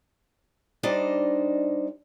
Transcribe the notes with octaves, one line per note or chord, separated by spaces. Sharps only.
G3 D4 D#4 C5 D5 D#5